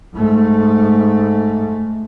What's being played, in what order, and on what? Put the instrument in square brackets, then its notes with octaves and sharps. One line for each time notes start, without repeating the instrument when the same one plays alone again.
[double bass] G#2 A3